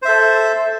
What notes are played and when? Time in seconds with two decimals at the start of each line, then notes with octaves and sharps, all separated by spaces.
0.02 C5
0.05 E5
0.08 A4